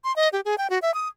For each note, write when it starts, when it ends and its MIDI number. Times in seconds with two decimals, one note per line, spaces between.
0.04 0.15 84
0.16 0.29 75
0.33 0.41 67
0.45 0.55 68
0.58 0.67 79
0.70 0.79 66
0.82 0.94 76
0.94 1.08 87